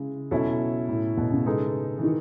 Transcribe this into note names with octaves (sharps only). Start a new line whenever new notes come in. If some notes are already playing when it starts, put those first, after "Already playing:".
Already playing: C#3 G#3 E4
B2 F#3 C#4 E4 A4 C#5
A2
B2
C#3
G#3 B3 D#4 A4
E3
D#3